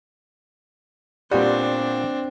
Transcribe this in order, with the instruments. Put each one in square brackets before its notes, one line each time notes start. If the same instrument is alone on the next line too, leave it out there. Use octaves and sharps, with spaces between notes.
[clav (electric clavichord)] A#2 B3 F#4 [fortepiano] G3 [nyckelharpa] C4 D4